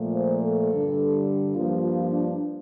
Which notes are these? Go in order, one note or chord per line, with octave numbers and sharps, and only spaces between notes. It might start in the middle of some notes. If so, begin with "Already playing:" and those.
Already playing: A#2 F3 A3
C5
A4
G2 D3 G3
G2 F3 A#3 F4
F4
D4